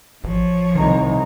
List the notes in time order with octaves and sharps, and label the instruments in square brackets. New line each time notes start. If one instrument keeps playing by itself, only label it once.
[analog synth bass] A1 [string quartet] F3 C#5
[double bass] C2 D#4 [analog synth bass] D#3